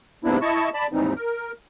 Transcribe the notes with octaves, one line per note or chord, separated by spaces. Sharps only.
G#2 C3 A#3 B3 D4 E4
E4 D#5 A5 C#6
D5 A5 B5
D#2 G#2 E3 G3 C4 D#4
A#4